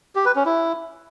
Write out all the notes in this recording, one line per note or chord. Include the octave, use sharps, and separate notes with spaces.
G4
B4
C#4
E4